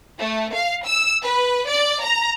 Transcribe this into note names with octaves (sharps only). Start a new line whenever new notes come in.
A3
F5
E6
B4
D5
A#5